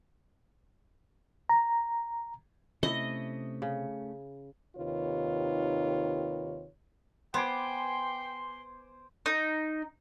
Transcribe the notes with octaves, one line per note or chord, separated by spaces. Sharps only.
A#5
C3 A3 C#4 E4 D#5
C#3
D#2 C3 D#3 F4 B4 C#5
B3 C5 G5 G#5 C6 D6
D#4